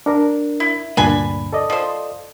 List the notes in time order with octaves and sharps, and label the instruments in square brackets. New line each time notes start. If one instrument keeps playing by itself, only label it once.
[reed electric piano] D4 A#4
[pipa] E4
[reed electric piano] D2 G2 A#2 [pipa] D4 G#5 B5
[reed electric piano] A4 D5 D#5
[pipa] F3 C5